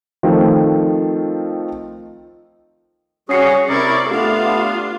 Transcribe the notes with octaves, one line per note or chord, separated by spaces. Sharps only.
D#3 F3 A3 C4
G3 C#4 F#4 G#4 D#6 C7 C#7
C3 E4 A#4 D5 C#6
A3 B3 D4 F4 G4 F5